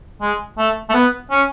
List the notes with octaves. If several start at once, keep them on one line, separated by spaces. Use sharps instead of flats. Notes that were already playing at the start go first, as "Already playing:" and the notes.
G#3
A3
A3
B3
C#4